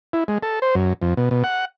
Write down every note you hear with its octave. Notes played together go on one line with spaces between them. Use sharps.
E4
G#3
A4
C5
F#2
F2
B2
B2
F#5